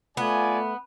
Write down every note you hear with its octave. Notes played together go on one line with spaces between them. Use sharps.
A3 B3 F4 D5 G#5 B5